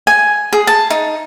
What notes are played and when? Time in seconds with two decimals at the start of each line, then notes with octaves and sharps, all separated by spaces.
0.07 G#5
0.53 G#4
0.67 A5
0.90 D#4